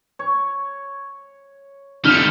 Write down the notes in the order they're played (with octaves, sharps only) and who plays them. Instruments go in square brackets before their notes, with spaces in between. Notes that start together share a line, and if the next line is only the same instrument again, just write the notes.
[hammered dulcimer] C#5
[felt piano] D3 [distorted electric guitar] D#3 G3 [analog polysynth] F6 C#7